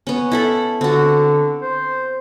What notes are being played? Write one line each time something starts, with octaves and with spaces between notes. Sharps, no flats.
B3 C#4
E4 A4 B5
D3 C4 F#4
C5